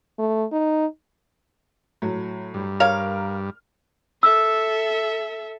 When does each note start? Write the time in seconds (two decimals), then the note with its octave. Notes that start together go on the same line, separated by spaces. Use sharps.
0.19 A3
0.52 D#4
2.02 A2 F#3
2.54 G2
2.80 A#4 C#5 F5 F6
4.23 A4 E5 E6